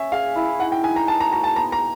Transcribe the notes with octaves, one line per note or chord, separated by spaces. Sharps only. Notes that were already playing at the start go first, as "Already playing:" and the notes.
Already playing: C#4 E5
G#4 F5
E4
D#4 F#5
G5
D#4 G#5
A#5
A#4 A5
A#5
F#4 A#5
A5
B3 A#5
A#5